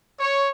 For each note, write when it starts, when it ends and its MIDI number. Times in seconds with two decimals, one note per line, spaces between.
0.20 0.49 73